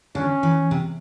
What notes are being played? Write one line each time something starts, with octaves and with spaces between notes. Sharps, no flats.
D3 C#4
E3
C3